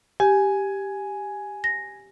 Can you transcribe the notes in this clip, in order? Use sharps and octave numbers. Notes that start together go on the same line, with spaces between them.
G4 G#5
A#6